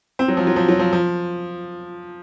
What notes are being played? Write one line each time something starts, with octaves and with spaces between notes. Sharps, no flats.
C4
F#3
F3
F#3
F3
F#3
F3
F3